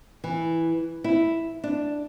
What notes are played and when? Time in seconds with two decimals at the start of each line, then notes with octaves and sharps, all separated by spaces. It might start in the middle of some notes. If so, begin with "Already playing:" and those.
0.24 E3
1.04 E4
1.64 D4